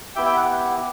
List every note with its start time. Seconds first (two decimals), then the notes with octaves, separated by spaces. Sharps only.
0.16 B3 E4 G4 E5 G5
0.26 E5 G5
0.37 F#5